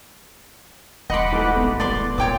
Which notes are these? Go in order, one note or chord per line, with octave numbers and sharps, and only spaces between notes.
D#1 E2 D#5 F#5 B5 C6 D6
G#2 E3 A3
A1 B3 E4
D#1 F4 D5 C6 D6
A#2 B3 C#5 G5 D6